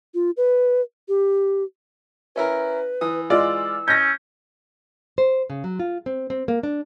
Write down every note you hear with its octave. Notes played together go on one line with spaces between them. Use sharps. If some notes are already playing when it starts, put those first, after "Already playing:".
F4
B4
G4
C#4 E4 A#4 B4
E3 D#6
G#3 F4 D5 E6
C#4 G6 A#6
C5
C#3
F#3
F4
C4
C4
A#3
D4